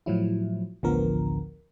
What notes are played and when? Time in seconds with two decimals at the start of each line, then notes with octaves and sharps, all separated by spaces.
0.06 A2 F3 F#3 E4
0.83 A1 D2 D3 F3 B3 A#4